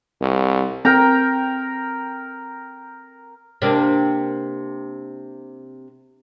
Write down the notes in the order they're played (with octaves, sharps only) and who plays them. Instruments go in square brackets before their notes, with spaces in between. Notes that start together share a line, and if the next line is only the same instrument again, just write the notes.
[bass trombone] C2
[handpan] C4 [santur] A#4 G5 A#5
[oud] C3 A#3 D4